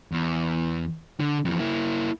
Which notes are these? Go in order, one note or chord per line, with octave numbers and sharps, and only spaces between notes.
E2
D3
F2 E3
A#3 E4